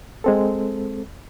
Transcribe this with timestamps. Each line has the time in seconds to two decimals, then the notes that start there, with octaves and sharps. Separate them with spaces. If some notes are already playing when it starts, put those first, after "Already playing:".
0.24 G#3 C4 A4